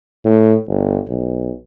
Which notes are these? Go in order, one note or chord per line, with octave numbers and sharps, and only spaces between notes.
A2
G1
B1